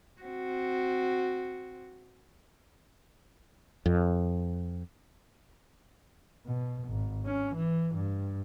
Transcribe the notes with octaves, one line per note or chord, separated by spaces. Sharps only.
C4 F#4
F2
B2
G#1
C#4
E3
G2